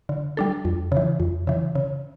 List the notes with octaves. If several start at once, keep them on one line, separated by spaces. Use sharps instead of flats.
D3
G3 D4 A4
F2
C#3 E3
F2
C#3 E3
C#3